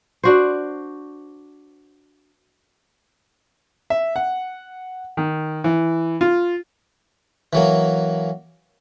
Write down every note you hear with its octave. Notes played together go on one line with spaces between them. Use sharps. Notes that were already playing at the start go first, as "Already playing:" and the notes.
D4 F#4 C5
E5
F#5
D#3
E3
F4
E3 F#3 A#3